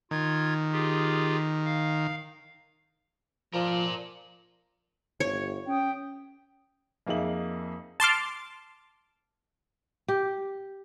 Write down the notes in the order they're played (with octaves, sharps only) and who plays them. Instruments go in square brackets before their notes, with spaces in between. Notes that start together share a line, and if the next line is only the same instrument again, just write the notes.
[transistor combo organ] D#3 [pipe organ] F4 G#6
[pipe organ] F4 G4 G#4
F5
[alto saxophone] F3 [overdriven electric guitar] A#4 D5
[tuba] G1 [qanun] C#5
[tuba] C#4 [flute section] G5 D#6
[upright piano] F2 A#3 D#4 G#4 E5 F#7
[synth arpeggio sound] A5 C6 D6 F6
[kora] G4